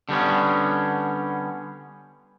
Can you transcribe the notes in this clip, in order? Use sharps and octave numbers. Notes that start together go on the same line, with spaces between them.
D3 G3 B3 C#4